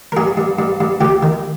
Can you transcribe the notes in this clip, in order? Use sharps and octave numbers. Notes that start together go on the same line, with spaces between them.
A#4
G2 G#4
G2
G2
G2
C#2 G4
D#3